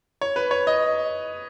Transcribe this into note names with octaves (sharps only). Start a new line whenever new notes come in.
C#5
B4
C#5
D#5